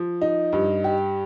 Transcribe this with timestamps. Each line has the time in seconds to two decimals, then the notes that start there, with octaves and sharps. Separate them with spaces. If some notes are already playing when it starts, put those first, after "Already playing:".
Already playing: F3
0.21 D#4
0.53 G2
0.84 G4